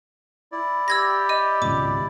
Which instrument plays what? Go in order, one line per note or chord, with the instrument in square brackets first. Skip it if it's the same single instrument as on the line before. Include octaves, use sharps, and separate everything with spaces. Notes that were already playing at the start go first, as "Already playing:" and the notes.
[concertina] E4 D5
[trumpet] G4 [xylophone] E6 G#6 A#6
[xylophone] D#5 D#7
[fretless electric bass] G#1 C#2 B2 [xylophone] D6